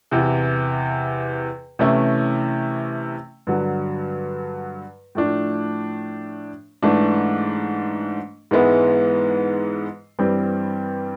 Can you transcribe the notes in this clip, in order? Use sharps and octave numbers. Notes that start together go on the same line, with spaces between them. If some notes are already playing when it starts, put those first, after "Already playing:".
E2 C3 E3
C3 E3 A3 C#4 E4
G2 D3 F#3
A2 F3 A3 D4
G#2 E3 A3 D4
G#2 E3 G#3 B3 E4
G2 E3 G3 C4